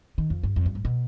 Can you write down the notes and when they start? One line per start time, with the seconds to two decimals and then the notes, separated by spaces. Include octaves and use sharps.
0.18 D#3
0.30 F2
0.43 G2
0.56 F2
0.66 G2
0.75 G#2
0.85 B2